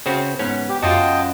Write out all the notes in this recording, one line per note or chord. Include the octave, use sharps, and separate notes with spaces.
C#3 C4 F#4
G#2 B3 C#4
G4
F#2 F4 F#4 D#5 G5 A5